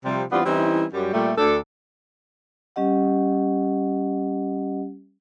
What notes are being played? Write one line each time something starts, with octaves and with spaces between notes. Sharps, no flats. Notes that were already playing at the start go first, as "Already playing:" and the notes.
C3 F3 G3
E3 G3 B3 C4 D4 F4
E3 G3 C4 C#4 D#4 E4
F#2 G3
A#2 G3 A3
D2 D4 A4
G3 C#4 G4 D#5 F#5